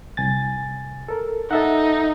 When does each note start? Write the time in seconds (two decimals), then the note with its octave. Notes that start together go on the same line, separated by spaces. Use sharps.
0.17 C2 G#5 A6
1.08 A4 A#4
1.51 D#4 A4 E5 F#5